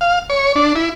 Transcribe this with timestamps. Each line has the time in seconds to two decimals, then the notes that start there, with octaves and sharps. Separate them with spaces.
0.01 F5
0.30 C#5
0.56 D4
0.75 E4